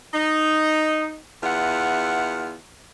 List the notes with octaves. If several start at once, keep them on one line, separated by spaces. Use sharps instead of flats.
D#4
E2 F4 E5 F#5